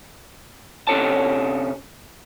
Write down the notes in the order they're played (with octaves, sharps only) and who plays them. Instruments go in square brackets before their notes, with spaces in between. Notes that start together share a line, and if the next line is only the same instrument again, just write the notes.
[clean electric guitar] C3 C#4 A4 C#5 A5